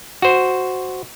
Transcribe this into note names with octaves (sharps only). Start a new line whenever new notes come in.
F#4 C5